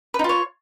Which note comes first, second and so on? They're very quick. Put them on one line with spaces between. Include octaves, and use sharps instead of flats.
B4 D#4 F4 C#5